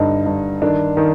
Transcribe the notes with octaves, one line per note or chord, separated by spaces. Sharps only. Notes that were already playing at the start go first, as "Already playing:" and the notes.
Already playing: G2 D3 D#4
G2
D#3 D4
D#3